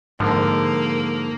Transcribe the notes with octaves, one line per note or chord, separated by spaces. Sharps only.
G#2 D3 F3 A#3